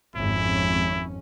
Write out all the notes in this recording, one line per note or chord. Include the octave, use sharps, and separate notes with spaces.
G#1 F2 C#4 E4